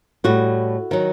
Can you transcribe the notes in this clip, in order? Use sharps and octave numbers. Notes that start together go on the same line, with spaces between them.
A2 G3 F#4
D#3 F#3